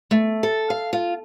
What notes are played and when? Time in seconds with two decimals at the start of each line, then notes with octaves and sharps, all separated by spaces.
0.11 A3
0.43 A4
0.70 F5
0.93 F4